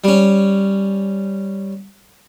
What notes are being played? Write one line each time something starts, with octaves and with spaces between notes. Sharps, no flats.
G3 C#4